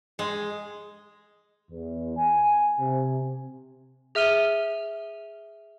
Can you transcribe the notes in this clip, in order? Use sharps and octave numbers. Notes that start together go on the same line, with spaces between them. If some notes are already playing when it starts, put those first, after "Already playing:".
G#3
E2
G#5
C3
G#4 E5 F6 D#7 G7